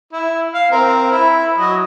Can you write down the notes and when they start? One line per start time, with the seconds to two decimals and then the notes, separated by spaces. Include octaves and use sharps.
0.13 E4
0.55 F5
0.71 C4 A#4
1.12 E4 B5
1.57 F#3 D#5